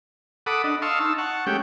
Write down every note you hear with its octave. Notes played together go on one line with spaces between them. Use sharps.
A4 F#5 B5 D6 D#6
D4 D#5
D#5 F5 A5 C6 C#6 E6
D#4 A5 E6
F#5 A5 C#6
G#3 A3 C#4 G4 G5